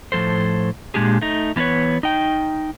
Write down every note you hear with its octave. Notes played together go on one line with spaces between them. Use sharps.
A2 F3 G#3 A4 C5
A#2 D#3 G#3 D4 G4 G#4
A3 D#4
E3 B3 C#4 B4 C#5
D#4 G5